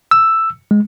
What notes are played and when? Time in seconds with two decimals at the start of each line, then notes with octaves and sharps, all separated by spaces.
0.11 E6
0.71 G#3